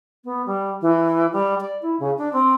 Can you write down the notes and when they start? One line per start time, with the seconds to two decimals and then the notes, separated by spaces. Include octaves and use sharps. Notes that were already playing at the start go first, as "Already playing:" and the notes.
0.24 B3
0.46 G3
0.81 E3
1.32 G3
1.60 D5
1.82 E4
1.99 C#3
2.18 D4
2.33 C4